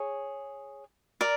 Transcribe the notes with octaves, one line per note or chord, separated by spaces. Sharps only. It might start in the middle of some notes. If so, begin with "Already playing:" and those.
Already playing: G#4 C#5
A#4 D5